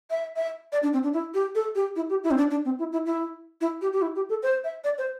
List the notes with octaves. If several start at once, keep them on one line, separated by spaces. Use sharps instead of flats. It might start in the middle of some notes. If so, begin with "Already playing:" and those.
E5
E5
D5
D4
C4
D4
E4
G4
A4
G4
E4
G4
E4
C4
D4
D4
C4
E4
E4
E4
E4
G4
G4
E4
G4
A4
C5
E5
D5
C5